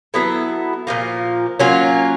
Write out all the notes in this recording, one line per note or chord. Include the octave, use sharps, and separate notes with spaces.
F#3 B3 E4 A4
A#2 F3 A#3
F#3 A#3 C#4 F4